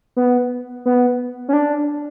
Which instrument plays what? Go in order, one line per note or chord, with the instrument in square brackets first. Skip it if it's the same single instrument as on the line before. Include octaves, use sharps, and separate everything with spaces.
[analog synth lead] B3
B3
C#4
D4